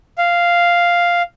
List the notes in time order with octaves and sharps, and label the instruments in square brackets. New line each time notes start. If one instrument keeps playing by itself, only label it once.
[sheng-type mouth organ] F5